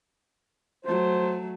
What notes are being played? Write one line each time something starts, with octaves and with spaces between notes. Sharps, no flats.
F#3 A3 C5